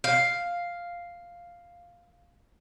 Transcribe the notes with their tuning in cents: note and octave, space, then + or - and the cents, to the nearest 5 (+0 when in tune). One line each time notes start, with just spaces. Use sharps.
F5 +0